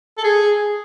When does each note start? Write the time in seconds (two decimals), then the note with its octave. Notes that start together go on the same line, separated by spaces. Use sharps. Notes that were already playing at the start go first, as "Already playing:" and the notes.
0.18 A4
0.24 G#4